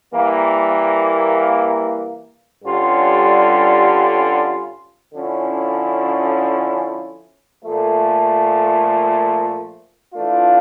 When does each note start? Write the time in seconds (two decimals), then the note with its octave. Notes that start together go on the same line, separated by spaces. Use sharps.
0.13 E3 G3 A#3
2.64 G2 D3 G3 C#4 F4
5.13 D3 F3 C#4 E4
7.63 A#2 F3 A3
10.14 E3 A3 D4 F4